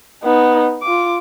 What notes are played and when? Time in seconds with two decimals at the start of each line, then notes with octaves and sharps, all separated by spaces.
0.23 B3 D#4
0.82 F4 D6